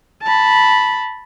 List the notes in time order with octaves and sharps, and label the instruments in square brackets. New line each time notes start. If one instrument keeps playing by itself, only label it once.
[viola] A5 B5